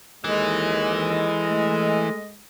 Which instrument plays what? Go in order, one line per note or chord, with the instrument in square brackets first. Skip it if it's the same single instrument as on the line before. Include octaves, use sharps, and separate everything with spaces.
[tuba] D#2 [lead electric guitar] E3 [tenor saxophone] G#3 [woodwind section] A4 D#5
[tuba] A3